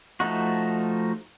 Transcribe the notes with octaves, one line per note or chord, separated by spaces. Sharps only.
F3 A3 D#4 F#4